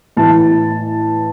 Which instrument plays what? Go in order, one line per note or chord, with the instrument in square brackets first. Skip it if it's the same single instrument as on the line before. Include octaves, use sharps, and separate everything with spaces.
[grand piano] A2 E3 A5